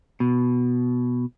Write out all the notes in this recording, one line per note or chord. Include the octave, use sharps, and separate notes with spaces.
B2